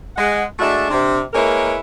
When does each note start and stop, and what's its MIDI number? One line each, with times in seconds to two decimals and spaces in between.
0.16 0.42 56
0.16 0.42 78
0.59 0.88 56
0.59 0.88 57
0.59 0.88 62
0.59 0.88 66
0.59 0.88 74
0.59 0.88 76
0.89 1.19 48
0.89 1.19 62
1.33 1.76 56
1.33 1.76 58
1.33 1.76 64
1.33 1.76 70
1.33 1.76 71
1.33 1.76 73